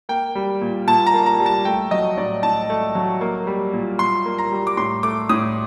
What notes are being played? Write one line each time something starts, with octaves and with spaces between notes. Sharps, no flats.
A#3 G5
G3
A#2
A#2 A5
A#5
A#3
A#5
G3
A5
A3 G5
F#3 D#5
A2 D5
A2 A5
A3
F#3
A#3
G3
A#2
A#2 C6
A#3
A#5
G3
D6
A2 C6
A3 D6
A2 D#6